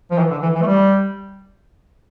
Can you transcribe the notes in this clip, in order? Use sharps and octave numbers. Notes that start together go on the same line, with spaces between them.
F3
E3
D3
E3
E3
A3
G3